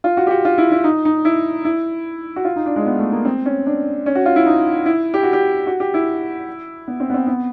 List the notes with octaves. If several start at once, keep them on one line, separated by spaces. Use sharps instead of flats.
F4
F#4
G4
F#4
F4
E4
E4
D#4
D#4
E4
E4
F#4
F4
D#4
D4
G#3
B3
A3
A#3
C4
C#4
D4
C#4
F#4
F4
E4
D#4
E4
G4
F#4
G4
F#4
G4
E4
B3
C4
B3
C4
B3